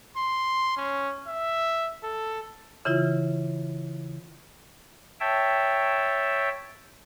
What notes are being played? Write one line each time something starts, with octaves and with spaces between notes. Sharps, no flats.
C6
C#4
E5
A4
C#3 E3 E4 F4
C#5 E5 G5 A5